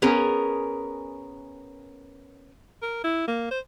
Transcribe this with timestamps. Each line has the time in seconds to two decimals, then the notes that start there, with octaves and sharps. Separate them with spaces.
0.02 B3 C#4 G#4 A#4
2.82 A#4
3.04 E4
3.28 A#3
3.51 C5